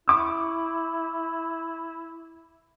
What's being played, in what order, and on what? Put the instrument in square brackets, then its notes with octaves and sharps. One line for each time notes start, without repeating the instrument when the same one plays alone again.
[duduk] E4 [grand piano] C#6 D6 E6